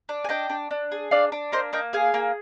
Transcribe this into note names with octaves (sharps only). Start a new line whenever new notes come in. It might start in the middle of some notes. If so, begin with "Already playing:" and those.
D4
G#5
D4 D#5 G5
D4
D4
G#4
D4 D5 F5
D4
A#3 C5 D#5
A#3 D#5 G5
G#4 F5 G#5
A#3